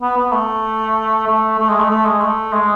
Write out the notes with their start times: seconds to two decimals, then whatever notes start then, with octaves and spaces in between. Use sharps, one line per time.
0.02 B3
0.17 B3
0.33 A3
1.28 A3
1.59 A3
1.70 G#3
1.80 A3
1.90 A3
2.05 G#3
2.21 A3
2.53 G#3